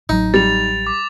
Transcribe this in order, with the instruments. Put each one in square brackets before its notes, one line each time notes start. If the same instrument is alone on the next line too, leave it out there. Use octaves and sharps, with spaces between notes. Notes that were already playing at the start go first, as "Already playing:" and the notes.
[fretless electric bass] A1 F#3 [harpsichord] D#4
[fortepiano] G3 [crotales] A6 F7
[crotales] D6